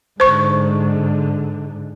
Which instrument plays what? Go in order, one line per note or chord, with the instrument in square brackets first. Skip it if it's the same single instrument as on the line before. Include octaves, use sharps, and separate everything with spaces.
[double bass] G#2 D3 [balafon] C5 C#6